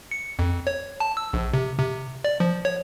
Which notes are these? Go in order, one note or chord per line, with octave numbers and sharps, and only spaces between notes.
C#7
F2
C#5
A5
E6
A#1
C3
C3
D5
F3
C#5